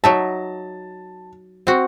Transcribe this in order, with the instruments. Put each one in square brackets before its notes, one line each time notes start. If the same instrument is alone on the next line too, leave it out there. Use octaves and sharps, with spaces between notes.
[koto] F#3 D#4 E5 [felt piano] A5
[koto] C4 F#4